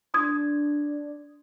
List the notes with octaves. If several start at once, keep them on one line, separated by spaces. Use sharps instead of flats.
D4 C6 D#6 G#6